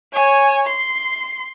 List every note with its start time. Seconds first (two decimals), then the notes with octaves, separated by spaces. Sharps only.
0.13 C#5 G#5
0.67 C6